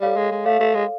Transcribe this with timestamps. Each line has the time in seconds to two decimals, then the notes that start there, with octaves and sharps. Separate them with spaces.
0.01 G3 A4 C#5 F5
0.16 G#3
0.31 G#3
0.45 A3 A4 C#5 F5
0.60 A3
0.75 G#3